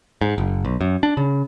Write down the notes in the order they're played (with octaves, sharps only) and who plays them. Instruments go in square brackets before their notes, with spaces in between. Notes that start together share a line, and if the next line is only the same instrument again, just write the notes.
[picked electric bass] G#2
F#1
B1
F#2
D4
C#3